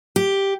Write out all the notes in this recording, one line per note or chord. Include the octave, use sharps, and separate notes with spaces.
G4